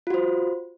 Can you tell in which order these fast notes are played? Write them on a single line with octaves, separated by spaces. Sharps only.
F4 F#4 C5